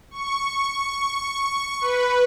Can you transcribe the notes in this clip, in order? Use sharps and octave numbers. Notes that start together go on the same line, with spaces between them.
C#6
B4